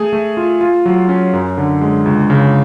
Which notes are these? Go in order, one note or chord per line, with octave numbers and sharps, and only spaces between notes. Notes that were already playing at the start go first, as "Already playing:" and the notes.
Already playing: A3 G#4
A3
F4
F4
F#3
C#4
F#2
D3
G#3
C#2
C#3